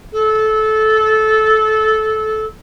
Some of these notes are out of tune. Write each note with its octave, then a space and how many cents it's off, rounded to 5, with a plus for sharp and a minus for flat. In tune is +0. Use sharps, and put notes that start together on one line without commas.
A4 -20